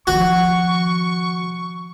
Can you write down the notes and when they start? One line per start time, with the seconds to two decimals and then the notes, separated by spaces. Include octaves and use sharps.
0.07 D#3 F3 F#4 C#6